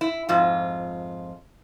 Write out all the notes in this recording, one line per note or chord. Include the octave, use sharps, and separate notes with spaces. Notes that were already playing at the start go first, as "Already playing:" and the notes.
E4
F2 G#2 F4